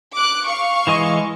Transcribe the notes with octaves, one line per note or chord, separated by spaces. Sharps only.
D6 F#6
F5 C#6
E3 G#3 D#5